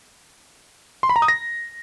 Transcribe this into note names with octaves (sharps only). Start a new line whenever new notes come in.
C6
B5
A#5
D#6
A#6